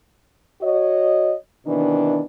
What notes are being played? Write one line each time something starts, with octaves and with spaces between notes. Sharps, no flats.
F#4 C#5 D#5
C3 D#3 E3 B3 D4